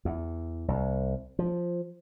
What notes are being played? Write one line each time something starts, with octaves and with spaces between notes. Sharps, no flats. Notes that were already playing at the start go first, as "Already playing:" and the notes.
E2
C2
F3